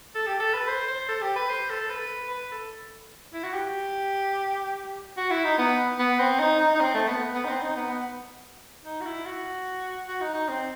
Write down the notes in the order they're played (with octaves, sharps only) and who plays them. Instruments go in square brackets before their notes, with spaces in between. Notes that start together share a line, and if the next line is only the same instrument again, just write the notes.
[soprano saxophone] A4
G4
A4
B4
C5
C5
A4
G4
B4
C5
A4
A4
B4
B4
A4
E4
F#4
G4
F#4
E4
D#4
B3
B3
C4
D#4
D#4
D#4
C4
A3
B3
B3
D#4
C4
D#4
B3
B3
D#4
F#4
E4
F#4
F#4
D#4
D#4
C4